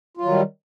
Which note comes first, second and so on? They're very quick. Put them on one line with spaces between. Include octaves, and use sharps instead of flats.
F4 F#3 D#3 G3